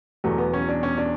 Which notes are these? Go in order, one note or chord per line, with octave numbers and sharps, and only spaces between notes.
E2 B2 F#3 A3
B3
C#4
D4
C#4
D4